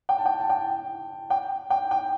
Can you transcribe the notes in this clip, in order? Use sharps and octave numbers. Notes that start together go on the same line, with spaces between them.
G5
A5
G5
A5
G5
G5
G5
G5